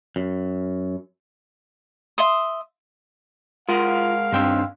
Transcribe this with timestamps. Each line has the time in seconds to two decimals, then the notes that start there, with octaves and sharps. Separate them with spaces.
0.16 F#2
2.18 E5 C6 D#6
3.69 G#3 F4 A#4 F5 F#5
4.33 G2 D#3 C4 D4 G5 E6